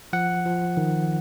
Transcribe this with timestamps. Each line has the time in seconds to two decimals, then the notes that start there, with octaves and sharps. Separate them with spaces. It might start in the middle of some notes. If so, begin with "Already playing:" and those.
0.13 F3 F#5
0.45 F3
0.77 D#3